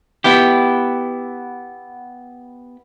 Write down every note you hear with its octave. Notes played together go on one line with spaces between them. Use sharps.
B3 E4 G4